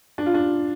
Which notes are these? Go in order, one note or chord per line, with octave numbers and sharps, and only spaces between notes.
D4
F4
D4